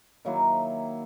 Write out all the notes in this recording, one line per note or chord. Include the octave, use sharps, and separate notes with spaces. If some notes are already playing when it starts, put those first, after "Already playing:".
D#3 F#3 A#3 E4